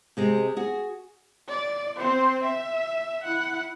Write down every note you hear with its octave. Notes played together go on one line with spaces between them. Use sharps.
C3 G#3 C4
F#4 G#4
D5
C4 C5
E5
E4 F#5